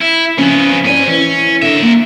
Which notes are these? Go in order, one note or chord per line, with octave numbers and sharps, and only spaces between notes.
E4
C#3 F3 B3 C#4 C5
G#2 C#4 C5 D5 G#5
E3 C#4
D3 A#4 E5
A#3